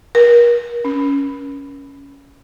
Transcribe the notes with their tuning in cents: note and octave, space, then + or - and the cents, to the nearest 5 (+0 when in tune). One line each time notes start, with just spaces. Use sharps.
A#4 +40
C#4 +10